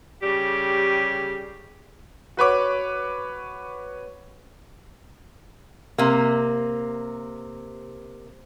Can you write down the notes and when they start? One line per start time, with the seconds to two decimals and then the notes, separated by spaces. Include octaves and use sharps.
0.23 C#3 G3 G4
2.37 F#4 B4 C#5 D6
5.98 C3 A#3